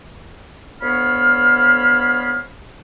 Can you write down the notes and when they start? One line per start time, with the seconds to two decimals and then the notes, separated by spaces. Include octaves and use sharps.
0.81 D2 B3 C#5 F5 B5 F6